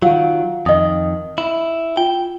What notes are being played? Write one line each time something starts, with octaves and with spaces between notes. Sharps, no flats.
D#3 F#3 F4 F5 F#5
F2 D#3 D#5 D#6
E4
F4 G5